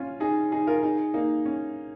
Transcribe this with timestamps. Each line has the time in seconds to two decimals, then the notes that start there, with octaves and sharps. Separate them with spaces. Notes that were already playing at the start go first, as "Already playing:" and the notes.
Already playing: C#4 F4
0.20 D#4 G#4
0.52 D#4 G#4
0.67 F4 A#4
0.83 D#4 G#4
1.14 A#3 D#4
1.46 C#4